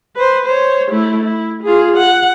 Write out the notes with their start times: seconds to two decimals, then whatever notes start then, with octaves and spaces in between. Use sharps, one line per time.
0.16 B4 C5
0.45 C5 C#5
0.91 A3 E4
1.23 E4
1.63 F4 G#4
1.97 F#5